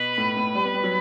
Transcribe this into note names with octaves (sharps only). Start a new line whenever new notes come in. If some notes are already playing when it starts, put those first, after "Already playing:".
Already playing: B2 B4
A2
A2
G3
B3
G3
F#3